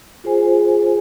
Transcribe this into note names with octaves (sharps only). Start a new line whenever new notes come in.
F4 G#4 C5 G#5